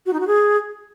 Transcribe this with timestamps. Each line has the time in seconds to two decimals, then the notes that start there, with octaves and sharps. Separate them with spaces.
0.06 F#4
0.13 D#4
0.20 F#4
0.27 G#4